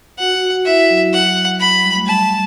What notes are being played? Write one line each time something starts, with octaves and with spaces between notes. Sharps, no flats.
F#4 F#5
F#4
F#4
E4 E5
F#3
F#5
B5
G3
A3
G3 A5
G3